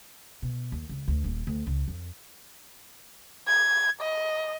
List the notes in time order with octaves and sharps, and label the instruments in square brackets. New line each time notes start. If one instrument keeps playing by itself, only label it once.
[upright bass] B2
D#2
C#2
D2
D#1
D2
C#2
F2
[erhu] G#6
D#5